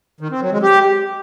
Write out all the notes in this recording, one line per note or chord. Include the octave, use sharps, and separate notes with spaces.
D#3
C4
F#3
G#3
G4